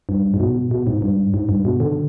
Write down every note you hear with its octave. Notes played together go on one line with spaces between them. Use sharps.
G2
G#2
B2
B2
G#2
G2
G#2
G2
B2
D3